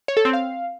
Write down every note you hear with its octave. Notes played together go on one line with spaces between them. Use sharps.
C#5
A4
C4
F5